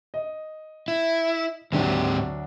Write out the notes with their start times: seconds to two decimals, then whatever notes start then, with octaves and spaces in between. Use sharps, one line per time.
0.14 D#5
0.88 E4
1.72 D2 G#2 F#3 C4 D4 G4